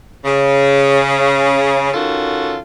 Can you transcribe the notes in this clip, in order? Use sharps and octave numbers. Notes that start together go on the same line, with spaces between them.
C#3
D#3 C#4 F4 F#4 A4